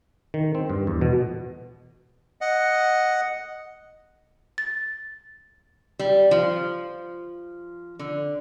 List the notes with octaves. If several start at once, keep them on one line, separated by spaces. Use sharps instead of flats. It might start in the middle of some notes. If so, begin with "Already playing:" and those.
D#3
C4
G2
E2
B2
D#5 F#5
A6
G3
F3
D3